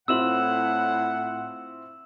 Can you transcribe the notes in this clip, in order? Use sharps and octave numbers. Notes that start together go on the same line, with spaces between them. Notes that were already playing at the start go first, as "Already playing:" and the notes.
A2 C4 E4 F4 F#5 E6 E7 F#7